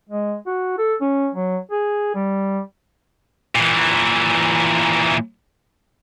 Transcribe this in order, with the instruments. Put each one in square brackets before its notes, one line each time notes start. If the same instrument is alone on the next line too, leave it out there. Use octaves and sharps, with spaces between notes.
[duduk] G#3
F#4
A4
C#4
F#3
G#4
G3
[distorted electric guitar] A#2 E3